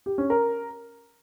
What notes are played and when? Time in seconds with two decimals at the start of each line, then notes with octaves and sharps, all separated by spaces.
0.06 G4
0.18 C#4
0.30 A#4